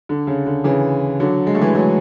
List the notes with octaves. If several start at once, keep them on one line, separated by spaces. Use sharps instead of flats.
D3
C#3
D3
C#3 E3
D3 F#3
G#3
A3
E3 G#3
F#3 A3